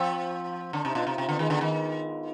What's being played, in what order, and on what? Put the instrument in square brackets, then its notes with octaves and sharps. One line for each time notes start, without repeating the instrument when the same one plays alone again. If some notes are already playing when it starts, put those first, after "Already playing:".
Already playing: [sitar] F3 [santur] C4
[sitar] D3 [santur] D4
[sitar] C3 [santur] D#4
[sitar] B2 [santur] D4 F4
[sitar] C3 [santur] D#4
[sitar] C3 [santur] C4
[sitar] D3 [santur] B3
[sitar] D#3 [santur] G#3
[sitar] D3 [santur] B3
[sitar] D#3